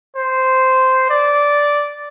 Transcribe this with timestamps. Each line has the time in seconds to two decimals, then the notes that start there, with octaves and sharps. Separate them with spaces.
0.16 C5
1.10 D5